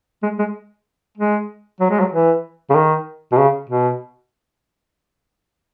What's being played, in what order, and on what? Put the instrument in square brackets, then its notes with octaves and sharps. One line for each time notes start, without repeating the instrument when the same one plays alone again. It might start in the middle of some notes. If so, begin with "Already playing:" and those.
[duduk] G#3
G#3
G#3
F#3
G#3
F#3
E3
C#3
D#3
B2
C#3
B2